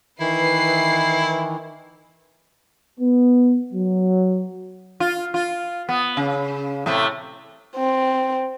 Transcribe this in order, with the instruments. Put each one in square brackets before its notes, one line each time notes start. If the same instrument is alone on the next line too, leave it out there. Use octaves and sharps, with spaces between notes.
[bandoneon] D#3 E3 [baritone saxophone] E4 [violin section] B4 C7
[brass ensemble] B3
F#3
[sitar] F4
F4
B3
C#3
A2 C3 A3
[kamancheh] C4